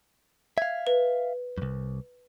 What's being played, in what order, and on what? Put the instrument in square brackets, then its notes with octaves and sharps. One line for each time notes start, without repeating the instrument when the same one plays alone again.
[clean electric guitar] E5 F5 [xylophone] G#6
[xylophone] B4
[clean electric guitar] C2 F#2